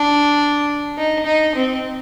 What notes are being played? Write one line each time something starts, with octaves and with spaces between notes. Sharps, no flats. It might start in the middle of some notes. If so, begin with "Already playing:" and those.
Already playing: D4
D#4
D#4
C4